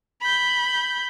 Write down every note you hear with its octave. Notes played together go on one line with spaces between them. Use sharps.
B5 G6